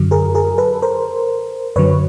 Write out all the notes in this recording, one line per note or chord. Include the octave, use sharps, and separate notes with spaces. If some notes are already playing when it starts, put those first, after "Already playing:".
Already playing: F#2 D3 F#3
G#4 A#4
G#4 A#4
A4 B4
A#4 C5
F#2 D3 F#3 B4 C#5